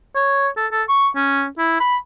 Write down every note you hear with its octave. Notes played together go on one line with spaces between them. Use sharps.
C#5
A4
A4
C#6
C#4
E4
B5